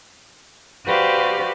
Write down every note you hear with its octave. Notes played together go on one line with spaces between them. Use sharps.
F#4 G4 B4 C5 D5 F5